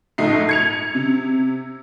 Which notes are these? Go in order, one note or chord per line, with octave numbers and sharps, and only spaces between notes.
A#1 G#2 A3 D#4 C7
G#6 C#7 F7
C3